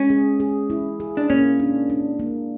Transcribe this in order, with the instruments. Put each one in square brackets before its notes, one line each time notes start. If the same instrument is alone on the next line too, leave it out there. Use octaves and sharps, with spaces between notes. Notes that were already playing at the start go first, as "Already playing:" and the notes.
Already playing: [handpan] G#3 [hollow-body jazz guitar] C#4
[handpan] G#4
G#4
E4
G#4
[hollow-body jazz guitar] D4
[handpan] A#3 [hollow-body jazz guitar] C#4
[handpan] D4
D4
A#3